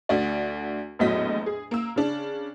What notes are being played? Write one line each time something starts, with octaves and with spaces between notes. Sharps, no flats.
D2 F#4 D5
A#1 E2 A2 F#3 D#5 B6
G#4
A#3 E6
C#3 D4